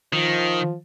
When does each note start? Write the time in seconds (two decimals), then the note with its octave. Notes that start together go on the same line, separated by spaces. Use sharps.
0.13 D#3 F3